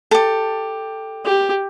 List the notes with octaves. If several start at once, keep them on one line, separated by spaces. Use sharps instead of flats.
G4 A4
G4